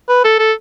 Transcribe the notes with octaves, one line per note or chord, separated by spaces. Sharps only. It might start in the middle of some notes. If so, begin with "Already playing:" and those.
B4
A4
A4